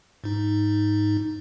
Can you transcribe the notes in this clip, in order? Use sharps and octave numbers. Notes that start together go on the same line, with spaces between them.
G#2 D#4